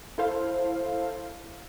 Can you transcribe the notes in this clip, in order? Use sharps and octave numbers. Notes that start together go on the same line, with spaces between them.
E4 A4 C5 F5